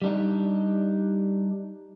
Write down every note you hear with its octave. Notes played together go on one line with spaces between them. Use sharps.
G3 D4 D#4